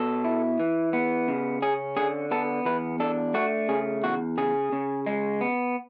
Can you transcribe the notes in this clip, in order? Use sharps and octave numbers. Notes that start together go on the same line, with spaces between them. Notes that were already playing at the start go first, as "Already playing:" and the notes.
Already playing: B2 A4
E4
E3
B3
C#3
C#4 G#4
D3 G#4
B3 A4
E2 B4
D4 A4
A3 F#4
C#3 G#4
E2 F#4
C#3 G#4
C#3
G#3
B3